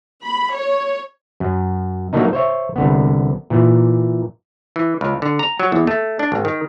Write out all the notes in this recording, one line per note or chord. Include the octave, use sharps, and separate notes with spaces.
B5
C#5
F#2
F#3 A3 A#3 D4 D#4
C5 C#5 E5
C2 D3 B3
A#2 E3
E3
C#2
D3
A#5
F#3
E2
A3
D4
G#1
D#3